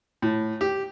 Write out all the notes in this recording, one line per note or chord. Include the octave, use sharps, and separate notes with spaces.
A2
G4